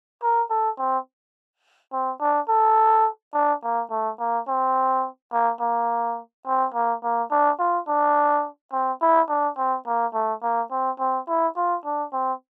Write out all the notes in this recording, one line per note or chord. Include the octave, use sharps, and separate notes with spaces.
A#4
A4
C4
C4
D4
A4
D4
A#3
A3
A#3
C4
A#3
A#3
C4
A#3
A#3
D4
F4
D4
C4
E4
D4
C4
A#3
A3
A#3
C4
C4
E4
F4
D4
C4